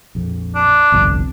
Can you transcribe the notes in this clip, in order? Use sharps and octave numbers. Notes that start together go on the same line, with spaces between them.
A#1 F2
D4
G1 C2 F2